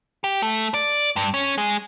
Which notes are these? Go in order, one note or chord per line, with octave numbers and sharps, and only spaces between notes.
G4
A3
D5
G2
C#4
G#3